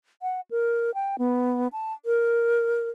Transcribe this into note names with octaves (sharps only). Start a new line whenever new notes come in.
F#5
A#4
G5
B3
A5
A#4